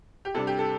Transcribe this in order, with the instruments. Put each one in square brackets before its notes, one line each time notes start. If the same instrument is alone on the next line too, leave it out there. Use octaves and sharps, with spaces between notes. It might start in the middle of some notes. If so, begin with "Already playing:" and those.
[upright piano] G4
C3 G3 D4 A4
G4
A4